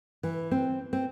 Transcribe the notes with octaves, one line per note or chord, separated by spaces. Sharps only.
E3
C4
C4